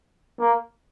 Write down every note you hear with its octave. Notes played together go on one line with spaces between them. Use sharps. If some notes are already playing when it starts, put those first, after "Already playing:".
A#3